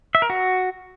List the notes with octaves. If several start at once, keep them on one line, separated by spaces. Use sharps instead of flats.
E5
A#4
F#4